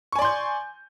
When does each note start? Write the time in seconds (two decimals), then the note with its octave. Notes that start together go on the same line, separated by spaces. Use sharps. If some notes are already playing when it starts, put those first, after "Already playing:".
0.12 C#6
0.16 G#5
0.19 D5
0.22 C6
0.25 G6